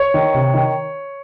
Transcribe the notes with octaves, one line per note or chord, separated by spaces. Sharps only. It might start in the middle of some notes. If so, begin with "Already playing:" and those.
Already playing: C#5
D#3
C3
D#3